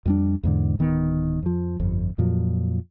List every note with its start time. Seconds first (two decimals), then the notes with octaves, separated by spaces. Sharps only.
0.06 F2 G3 D4
0.43 E2 G#2 D3
0.79 D1 D#3 B3
1.43 F2 F3
1.80 G1 F2
2.18 F2 A#2 F3 F#3